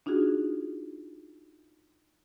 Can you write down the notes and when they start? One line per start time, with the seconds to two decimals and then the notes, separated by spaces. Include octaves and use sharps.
0.06 D4 D#4 F4 F#4 G#4